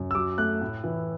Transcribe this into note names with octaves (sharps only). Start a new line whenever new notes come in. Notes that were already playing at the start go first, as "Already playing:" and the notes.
Already playing: F#2
E6
F#3 D6
A3 F#6
A2
E3